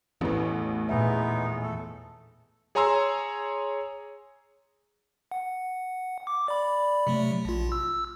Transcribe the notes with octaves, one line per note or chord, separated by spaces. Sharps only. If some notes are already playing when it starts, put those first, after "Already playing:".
A1 E2 A2 B4
A#2 G#3 B3 D#4 G#4 E5
A3 A4
G#4 C#5 G#5 A#5 C6 E6
F#5
D6
D5 B5
C3 F#3 A3
A#1 F4
E6